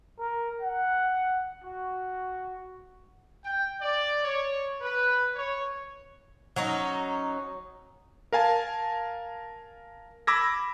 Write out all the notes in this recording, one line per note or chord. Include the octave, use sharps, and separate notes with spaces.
A#4
F#5
F#4
G5
D5
C#5
B4
C#5
F#3 C#4 D#4
A#4 F5 G#5 A5
B5 D6 E6 G#6 A#6